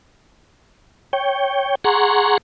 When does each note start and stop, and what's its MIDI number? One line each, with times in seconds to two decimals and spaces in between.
1.13 1.75 73
1.13 1.75 79
1.84 2.38 68
1.84 2.38 78
1.84 2.38 82
1.84 2.38 84
1.84 2.38 85